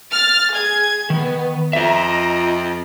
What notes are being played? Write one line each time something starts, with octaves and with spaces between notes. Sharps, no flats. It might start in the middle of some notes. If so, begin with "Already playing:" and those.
F6 A6
G#4 G#6
D#3 B3
F2 F4 D#5 E5 A#5